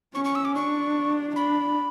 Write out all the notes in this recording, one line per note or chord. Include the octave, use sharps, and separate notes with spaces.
C#4 C#6
C#6
E6
D6
D4 C#6
D4 B5